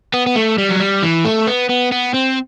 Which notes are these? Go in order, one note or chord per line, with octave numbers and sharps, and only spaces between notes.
B3
B3
A3
G3
F#3
G3
E3
A3
B3
B3
B3
C4